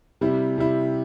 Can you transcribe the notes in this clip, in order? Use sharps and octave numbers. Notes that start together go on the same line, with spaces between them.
C3 G3 E4
C3 G3 E4